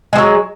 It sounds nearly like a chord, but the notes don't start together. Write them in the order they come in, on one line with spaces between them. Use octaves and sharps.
G#3 F3 F#3